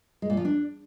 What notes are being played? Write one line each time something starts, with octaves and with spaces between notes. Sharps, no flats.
G#3
A#2
F3
D4